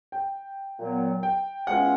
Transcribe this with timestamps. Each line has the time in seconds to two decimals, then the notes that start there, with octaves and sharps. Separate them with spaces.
0.12 G5
0.79 A#2 F#3 B3
1.23 G5
1.67 E2 B2 G#3 C#4 F4 F#5